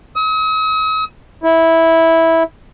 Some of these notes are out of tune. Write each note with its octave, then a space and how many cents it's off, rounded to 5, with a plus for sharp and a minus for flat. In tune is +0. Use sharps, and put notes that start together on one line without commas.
D#6 +45
E4 -10